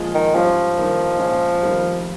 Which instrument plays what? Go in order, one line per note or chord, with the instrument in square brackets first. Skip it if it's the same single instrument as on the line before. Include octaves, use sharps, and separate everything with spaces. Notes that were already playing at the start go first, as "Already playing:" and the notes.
Already playing: [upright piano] A#2 F3 G#3
[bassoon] D#3
[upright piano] G#2 G3 C#4 F4 [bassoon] F3
[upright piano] G2 D#3 A#3 D#4
A#1 A#2 G#3 C#4
F1 F2 D#3 G3 A#3